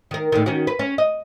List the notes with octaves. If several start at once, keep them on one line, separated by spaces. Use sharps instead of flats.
D#3 A#4
A2 D3 D#3
D#3 C#4 F#4
B4
C#4
D#5